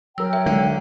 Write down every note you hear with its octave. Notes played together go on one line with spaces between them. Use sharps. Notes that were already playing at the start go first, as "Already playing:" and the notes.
F#3 A#4 C#5 G5 E6
E5
D3 G#3